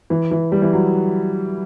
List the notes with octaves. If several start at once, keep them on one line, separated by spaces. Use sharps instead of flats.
E3
E3
G3
E3
F#3